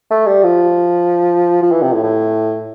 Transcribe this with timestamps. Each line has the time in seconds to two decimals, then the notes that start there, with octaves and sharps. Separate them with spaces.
0.11 A3
0.27 G3
0.43 F3
1.62 F3
1.71 E3
1.82 C3
1.93 A2
2.03 A2